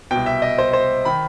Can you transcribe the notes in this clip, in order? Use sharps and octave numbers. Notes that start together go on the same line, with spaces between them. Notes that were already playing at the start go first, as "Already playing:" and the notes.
C2 B2 G5
E5
D#5
C5
C5
D#3 B5